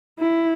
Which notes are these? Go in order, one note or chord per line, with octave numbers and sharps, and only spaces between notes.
E4